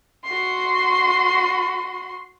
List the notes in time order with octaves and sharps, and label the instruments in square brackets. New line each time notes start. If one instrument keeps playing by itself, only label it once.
[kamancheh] F#4 C6